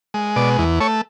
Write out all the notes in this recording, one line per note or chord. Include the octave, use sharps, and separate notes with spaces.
G#3
B2 D5
E2
A3 C#5